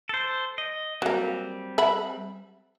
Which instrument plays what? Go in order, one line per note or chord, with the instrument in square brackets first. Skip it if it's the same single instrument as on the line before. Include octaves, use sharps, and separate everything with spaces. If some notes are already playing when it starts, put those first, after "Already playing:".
[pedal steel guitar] A4 C5
D#5
[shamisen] F#3 A#3 [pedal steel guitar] G3 C4
[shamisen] E5 F#5 B5